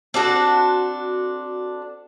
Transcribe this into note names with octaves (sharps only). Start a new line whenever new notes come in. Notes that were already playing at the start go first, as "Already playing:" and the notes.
C4 D4 F#4 A4